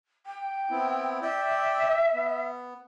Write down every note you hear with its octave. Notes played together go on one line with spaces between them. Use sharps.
G5
B3 C4 E4
D5 E5 G5
B3